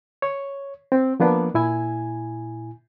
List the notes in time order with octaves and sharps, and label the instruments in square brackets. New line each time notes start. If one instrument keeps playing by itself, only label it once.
[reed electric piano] C#5
C4
F3 A#3 B3 D4
A#2 E4 G#5